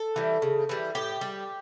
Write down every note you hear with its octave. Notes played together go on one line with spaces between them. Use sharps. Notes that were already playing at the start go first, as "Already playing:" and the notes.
Already playing: A4
E3 G3
C#3
E3 G3
A2 G4
G3